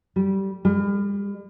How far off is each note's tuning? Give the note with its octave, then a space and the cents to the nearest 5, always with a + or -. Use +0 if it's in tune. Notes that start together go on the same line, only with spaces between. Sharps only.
G3 -15
G3 +40